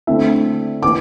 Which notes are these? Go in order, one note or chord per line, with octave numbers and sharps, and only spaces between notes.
D3 A3 C4 E4 E5
E3 D6